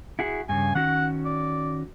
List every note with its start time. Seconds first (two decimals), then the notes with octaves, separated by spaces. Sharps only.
0.19 E4 F#4 G#4
0.49 G2 C#3 G#5
0.75 D#3 C#4 F#4 F#5
1.26 D5